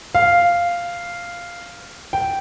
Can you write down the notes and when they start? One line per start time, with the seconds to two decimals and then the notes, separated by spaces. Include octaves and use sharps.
0.15 F5
2.13 G5